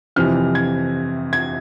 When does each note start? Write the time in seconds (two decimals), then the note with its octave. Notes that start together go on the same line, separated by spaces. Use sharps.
0.16 F2 C3 E3 F6
0.55 G#6
1.33 G#6